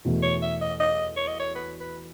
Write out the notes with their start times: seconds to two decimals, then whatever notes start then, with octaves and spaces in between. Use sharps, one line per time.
0.05 E2 B2 A3
0.23 C#5
0.42 E5
0.61 D#5
0.80 D#5
1.17 C#5
1.28 D#5
1.40 C#5
1.55 B4
1.80 B4